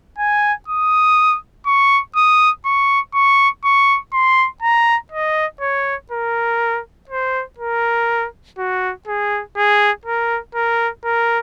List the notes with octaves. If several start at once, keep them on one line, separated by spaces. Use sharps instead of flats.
G#5
D#6
C#6
D#6
C#6
C#6
C#6
C6
A#5
D#5
C#5
A#4
C5
A#4
F#4
G#4
G#4
A#4
A#4
A#4